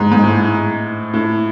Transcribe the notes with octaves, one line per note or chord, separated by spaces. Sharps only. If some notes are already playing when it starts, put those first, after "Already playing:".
Already playing: G#2
G#2
A2
A2